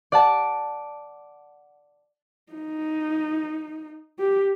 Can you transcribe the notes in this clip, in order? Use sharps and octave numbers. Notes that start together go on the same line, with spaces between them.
D5 F#5 A5
D#4
G4